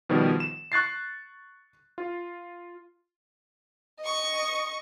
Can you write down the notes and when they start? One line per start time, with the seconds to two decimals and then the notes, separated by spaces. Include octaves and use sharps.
0.09 B2 D#3 F3 G3 B3
0.40 E7
0.72 C#6 F#6 A6 C7
1.98 F4
4.01 D#5 C#6